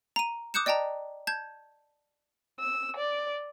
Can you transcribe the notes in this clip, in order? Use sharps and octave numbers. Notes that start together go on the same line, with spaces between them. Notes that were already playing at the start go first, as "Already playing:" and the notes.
A#5 D#7
D6 D#6 F#6 G6 C#7 E7
D5 D#5 G5 A5 A#5
A5 G6 G#6
E6
D5